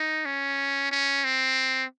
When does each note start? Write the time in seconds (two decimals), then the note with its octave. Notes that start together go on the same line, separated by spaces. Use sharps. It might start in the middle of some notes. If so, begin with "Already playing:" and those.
Already playing: D#4
0.25 C#4
0.91 C#4
1.24 C4